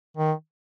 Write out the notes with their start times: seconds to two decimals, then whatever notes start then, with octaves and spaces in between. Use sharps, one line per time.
0.17 D#3